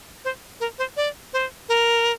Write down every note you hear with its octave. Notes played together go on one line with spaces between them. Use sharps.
C5
A#4
C5
D5
C5
A#4